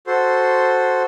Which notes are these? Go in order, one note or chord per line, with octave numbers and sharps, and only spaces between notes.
F#4 A4 C5 C6